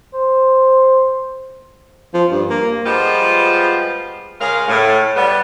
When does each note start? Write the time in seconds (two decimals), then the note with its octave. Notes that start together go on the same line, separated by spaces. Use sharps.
0.14 C5
2.14 F3
2.31 G2
2.50 A#3
2.86 F3 G3 G#3 B3 F4 G4
4.41 C#3 G#3 C#4 A#4 F5
4.68 A2
5.16 G3 B3